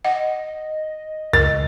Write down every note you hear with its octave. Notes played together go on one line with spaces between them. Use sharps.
D#5 F#5
C#2 A#4 D#5 A6